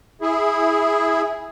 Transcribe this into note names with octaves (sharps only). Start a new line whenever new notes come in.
E4 G#4